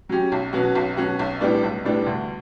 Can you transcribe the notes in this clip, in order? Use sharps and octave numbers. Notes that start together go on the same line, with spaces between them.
F#3 C#4 G4
B1
B2 F#3 C#4 F#4
B1
B2 F#3 C#4 F#4
B1
A2 G3 B3 D4
B1
A2 G3 B3 D4
D2